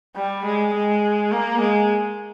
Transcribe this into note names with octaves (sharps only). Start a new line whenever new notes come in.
G3
G#3
G#3
A#3
G#3